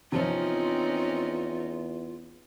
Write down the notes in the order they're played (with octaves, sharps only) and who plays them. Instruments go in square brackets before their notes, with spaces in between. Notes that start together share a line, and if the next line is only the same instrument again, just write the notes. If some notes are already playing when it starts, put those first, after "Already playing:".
[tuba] E2 [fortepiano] C3 F3 [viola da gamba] C4 C#4 D#4 [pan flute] F4